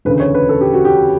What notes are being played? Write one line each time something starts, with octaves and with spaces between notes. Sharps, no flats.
E1 D2 C#3 B4
C#5
B4
A4
G4
F#4
G4